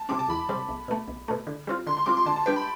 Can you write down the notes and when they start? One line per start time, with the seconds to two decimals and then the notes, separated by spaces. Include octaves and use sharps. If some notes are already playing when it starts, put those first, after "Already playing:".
Already playing: A5
0.09 C3 G3 C4 D6
0.19 A5
0.28 E2 B5
0.49 C3 G3 C4
0.69 B1
0.88 B2 A3
1.08 B1
1.28 B2 A3
1.47 D3
1.67 G3 C4 F4
1.87 D3 C6
1.97 C6
2.06 G3 C4 F4 D6
2.17 C6
2.26 D3 A5
2.36 A5
2.46 G3 D4 G4 B4 G5
2.56 B5